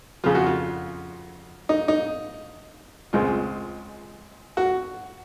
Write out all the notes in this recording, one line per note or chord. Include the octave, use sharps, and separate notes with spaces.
F2 C#3 F3 F4
F#4
F4
D#4
D#4
C#2 C#3 G#3 C4 F4
F#4